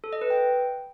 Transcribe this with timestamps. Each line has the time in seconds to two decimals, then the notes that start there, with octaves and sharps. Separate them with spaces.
0.04 A4
0.13 D#5
0.21 B4
0.30 G5